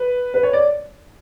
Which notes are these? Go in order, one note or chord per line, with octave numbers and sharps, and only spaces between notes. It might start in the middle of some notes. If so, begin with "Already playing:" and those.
Already playing: B4
B4
C#5
D5